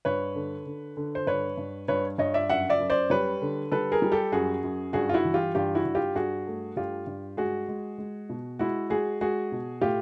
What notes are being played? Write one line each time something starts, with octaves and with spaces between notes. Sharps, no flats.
G2 B4 C#5
D3
D3
D3
C5
G2 B4 C#5
G2
G2 B4 C#5
G2 C#5 D#5
D5 E5
F#2 E5 F#5
D5 E5
F#2
C5 D5
G3 B4 C#5
D3
G3 A4 B4
G#4 A#4
G3
G4 A4
F#2 F#4 G#4
F#2
G2 F#4 G#4
F4
E4 F#4
E3
F4 G4
G2 F4 G4
E4 F#4
G2
F4 G4
G2 F#4 G#4
A3
G2 F4 G4
G2
G#3 F#4 G#4
G#3
G#3
B2
G#3 E4 F#4
G#3 F#4 G#4
G#3 F#4 G#4
B2
A2 F4 G4